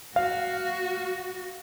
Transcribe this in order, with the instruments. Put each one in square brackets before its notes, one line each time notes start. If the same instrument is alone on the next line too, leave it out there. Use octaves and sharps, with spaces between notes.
[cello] F#4 [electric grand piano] F5